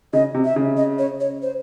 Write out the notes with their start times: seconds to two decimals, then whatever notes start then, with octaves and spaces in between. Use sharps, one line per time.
0.13 C#3 D#5
0.34 C3
0.45 E5
0.56 C#3
0.77 D#5
0.99 C#5
1.20 C#5
1.42 C5